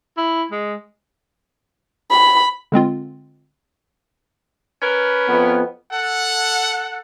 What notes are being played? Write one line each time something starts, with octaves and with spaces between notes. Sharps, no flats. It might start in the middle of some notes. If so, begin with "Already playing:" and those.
E4
G#3
B5
D3 G#3 C4 F4
C#4 A#4 B4
F2 B3
A4 F#5